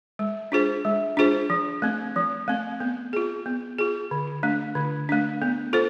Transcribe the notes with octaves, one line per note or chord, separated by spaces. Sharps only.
G#3
D4 F4 G#4 C5
G#3
D4 F4 G#4 C5
F3
A3 C4
F3
A3 C4
B3
F4 G#4
B3
F4 G#4
D3
A3 D4
D3
A3 D4
B3
F4 A4 C5